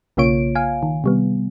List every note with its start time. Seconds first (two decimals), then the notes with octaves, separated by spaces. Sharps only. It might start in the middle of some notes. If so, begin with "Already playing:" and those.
0.17 B1 C#3 A#3 F4 C#5 D7
0.55 F5 G#5
0.83 D#3
1.04 C3 G3 B3